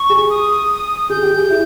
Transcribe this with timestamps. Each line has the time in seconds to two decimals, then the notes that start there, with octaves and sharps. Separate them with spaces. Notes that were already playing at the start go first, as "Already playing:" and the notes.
Already playing: C#6
0.10 G#4
0.30 D#6
1.10 G#4 G6
1.23 G4
1.36 G#4
1.50 E4